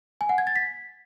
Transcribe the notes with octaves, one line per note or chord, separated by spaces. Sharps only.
G#5
F#5
G#6
A6
B6